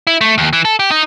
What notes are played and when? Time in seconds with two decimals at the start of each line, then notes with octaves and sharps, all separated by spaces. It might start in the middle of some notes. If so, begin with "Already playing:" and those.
0.07 E4
0.21 A3
0.38 D#2
0.53 E3
0.65 A4
0.79 G4
0.91 D#4